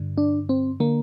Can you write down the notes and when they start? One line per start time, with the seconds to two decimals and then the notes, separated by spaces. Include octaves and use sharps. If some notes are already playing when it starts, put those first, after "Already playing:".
Already playing: G2 D3
0.18 D4
0.49 C4
0.80 D3 A#3